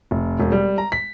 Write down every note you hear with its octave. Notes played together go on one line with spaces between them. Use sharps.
F1
E1
G3
A#5
B6